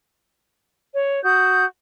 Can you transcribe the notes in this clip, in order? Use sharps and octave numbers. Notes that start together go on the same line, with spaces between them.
C#5
F#4 D#6 G6